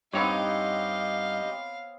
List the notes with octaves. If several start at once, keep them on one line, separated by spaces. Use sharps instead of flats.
G2 B3 C4 D#4 G4 C#5 D#5 F5